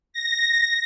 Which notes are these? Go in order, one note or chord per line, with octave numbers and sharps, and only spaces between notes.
A#6